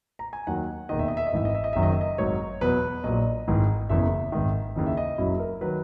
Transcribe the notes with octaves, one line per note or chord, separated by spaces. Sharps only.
A#5
G#5
D#2 D#3 F#3 F#5
E1 D#2 D#3 D#5
E5
D#5
E5
D#5
G#1 G#2 E3 E5
D#5
E5
D#5
F#1 F#2 D#3 F#3 E5
D#5
E5
D#5
G#1 G#2 F#3 C#5
E2 B2 F#3 B4
A#1 A#2 F#3 D#5
G#1 G#2 E3
F#1 E2 C#3 E3 E5
G#1 G#2 D#3
D#2 C#3 E3 D#5
E5
D#5
F#1 F#2 C#3 F#3 E4
A#4
D#3 F#3 B4